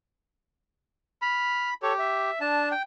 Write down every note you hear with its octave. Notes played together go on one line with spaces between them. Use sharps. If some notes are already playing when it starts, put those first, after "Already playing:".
B5 F6
G4 A4 C#5
E5
D4 A5
G5